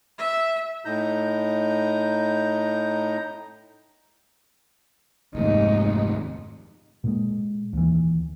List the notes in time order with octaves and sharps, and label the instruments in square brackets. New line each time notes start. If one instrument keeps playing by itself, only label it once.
[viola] E5
[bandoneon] A2 D#4 A#5 G6
[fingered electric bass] F1 D#2 [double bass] G#2 D#4
[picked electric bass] A#2 G#3
D#2 E3